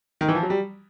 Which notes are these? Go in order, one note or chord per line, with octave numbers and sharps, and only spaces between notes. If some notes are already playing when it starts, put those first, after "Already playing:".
D#3
E3
F3
F#3
G3